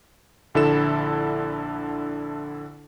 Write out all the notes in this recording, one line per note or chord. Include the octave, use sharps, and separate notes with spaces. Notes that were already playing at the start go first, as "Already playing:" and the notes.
A#1 D3 E4 A4 E7